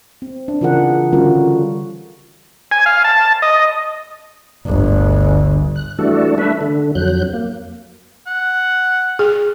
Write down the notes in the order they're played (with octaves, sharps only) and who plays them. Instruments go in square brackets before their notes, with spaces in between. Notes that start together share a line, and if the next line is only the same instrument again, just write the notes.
[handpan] C4
D4
C#3 E3 F4 G#4 A#4 F#5
D3 G3 C#4 F4 F#4 A#4
[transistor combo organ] G#5
F5
A5
D#5
[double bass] G1 D2
[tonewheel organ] F#6
E3 G3 A3 D4 F#4 A4
A3 D4 B4 E5
D3
F2 F#3 F#6 G6
A#3
[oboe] F#5
[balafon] G#4